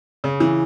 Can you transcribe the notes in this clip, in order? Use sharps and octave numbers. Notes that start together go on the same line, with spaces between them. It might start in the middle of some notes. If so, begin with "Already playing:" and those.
C#3
E3